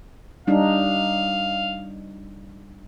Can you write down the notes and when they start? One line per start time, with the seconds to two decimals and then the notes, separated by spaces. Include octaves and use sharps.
0.47 G3 D4 D#4 F5